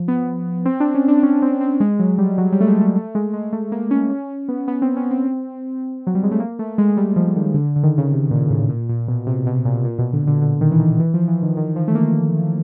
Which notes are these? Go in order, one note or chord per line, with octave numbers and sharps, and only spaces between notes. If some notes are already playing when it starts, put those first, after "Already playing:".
Already playing: F3
B3
C4
D4
C#4
D4
C#4
C4
C4
G#3
F#3
G3
F#3
G3
A3
G#3
A3
A3
G#3
G#3
A3
A#3
C#4
C#4
B3
B3
C4
C#4
C4
F#3
G3
G#3
A3
A#3
A3
G#3
G#3
G3
F3
D#3
D3
D3
D#3
C#3
C3
A#2
A2
A#2
A#2
B2
C3
B2
A#2
A#2
B2
D3
D3
D3
D#3
E3
D#3
E3
F3
E3
D#3
D#3
F3
A3
A#3